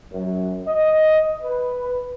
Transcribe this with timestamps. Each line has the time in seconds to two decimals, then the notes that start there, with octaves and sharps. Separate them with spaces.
0.12 F#2
0.68 D#5
1.43 B4